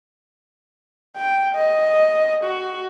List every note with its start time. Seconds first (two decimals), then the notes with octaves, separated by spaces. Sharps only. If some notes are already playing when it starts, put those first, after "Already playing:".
1.16 G5
1.55 D#5
2.44 F#4